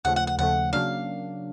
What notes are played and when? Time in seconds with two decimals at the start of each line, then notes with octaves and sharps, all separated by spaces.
0.05 D#2 C#3 F3 A3 F#5
0.16 F#5
0.27 F#5
0.38 D#2 C#3 F3 A3 F#5
0.73 C#3 F#3 A#3 D4 F5